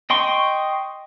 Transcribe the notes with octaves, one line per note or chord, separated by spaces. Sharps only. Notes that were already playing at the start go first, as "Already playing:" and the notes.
D#5 G5 C6 C#6